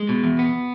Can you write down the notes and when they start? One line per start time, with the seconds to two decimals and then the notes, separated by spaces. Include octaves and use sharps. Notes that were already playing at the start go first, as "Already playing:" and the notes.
Already playing: G#3
0.09 B2
0.24 E2
0.39 B3